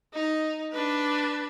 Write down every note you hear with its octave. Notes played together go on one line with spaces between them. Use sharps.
D#4
D4 B4